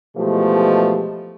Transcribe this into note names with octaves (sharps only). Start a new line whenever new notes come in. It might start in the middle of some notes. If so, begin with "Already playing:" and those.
B2 E3 F3 G#3 A3 G4